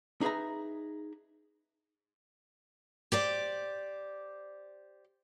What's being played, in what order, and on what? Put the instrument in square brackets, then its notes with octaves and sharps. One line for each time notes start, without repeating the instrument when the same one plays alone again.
[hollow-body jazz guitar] D#4 G#4 B4 E5 A#5
[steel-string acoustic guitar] G4 C5 D5